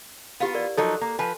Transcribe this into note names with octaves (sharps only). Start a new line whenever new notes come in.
B3 E4 F4 G4 F5
A#4 D5
F3 F#3 D#4 A4
A#3
F3 B4 G#5